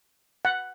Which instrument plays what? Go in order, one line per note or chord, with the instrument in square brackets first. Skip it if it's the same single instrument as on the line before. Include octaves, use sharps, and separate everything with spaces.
[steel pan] F#5